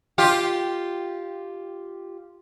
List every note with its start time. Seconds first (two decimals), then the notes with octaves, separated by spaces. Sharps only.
0.18 F4 G4